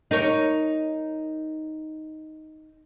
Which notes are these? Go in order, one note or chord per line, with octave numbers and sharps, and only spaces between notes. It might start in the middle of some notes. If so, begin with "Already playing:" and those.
D#4 A#4 C#5